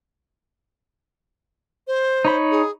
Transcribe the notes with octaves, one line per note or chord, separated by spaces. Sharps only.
C5
D#4 C#5 B5
G#4